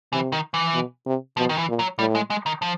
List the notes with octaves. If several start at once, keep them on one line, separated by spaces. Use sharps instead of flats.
C3 E3
D#3
E3
B2
C3
B2 F3
D#3
E3
A#2
F#3
A2 G3
G#3
G#3
D#3
F3